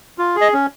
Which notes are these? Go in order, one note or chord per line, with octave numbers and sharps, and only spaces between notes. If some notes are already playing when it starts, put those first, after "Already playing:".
F4
G#4
D#5
C#4